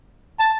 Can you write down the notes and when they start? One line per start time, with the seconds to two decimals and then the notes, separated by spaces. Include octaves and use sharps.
0.40 A5